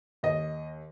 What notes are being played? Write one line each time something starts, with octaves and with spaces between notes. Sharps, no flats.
D#2 D#5